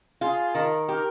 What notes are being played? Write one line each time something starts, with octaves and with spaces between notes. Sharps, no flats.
F4 G#4
D#3 A#4
G4 A#4